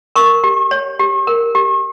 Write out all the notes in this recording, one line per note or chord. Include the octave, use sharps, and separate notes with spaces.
A#4 C#6
G4
C#5
G4
A#4
G4